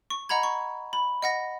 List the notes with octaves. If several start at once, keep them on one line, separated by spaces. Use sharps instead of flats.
C#6
D#5 F#5 A#5 B5 G#6
C#6
B5
D#5 F#5 A#6